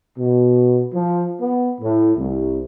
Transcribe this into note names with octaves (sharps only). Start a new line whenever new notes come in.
B2
F3
B3
A2
C2